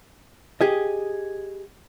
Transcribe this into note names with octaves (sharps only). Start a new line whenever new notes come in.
G4 G#4 D#5